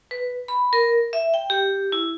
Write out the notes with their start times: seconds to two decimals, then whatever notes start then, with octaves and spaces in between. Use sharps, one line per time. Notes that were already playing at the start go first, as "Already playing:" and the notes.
0.11 B4
0.48 B5
0.73 A#4
1.13 E5
1.34 G5
1.50 G4
1.92 E4